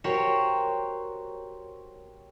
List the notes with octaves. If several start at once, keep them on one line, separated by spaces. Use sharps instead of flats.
F#4 G4 A#4 C5 C#5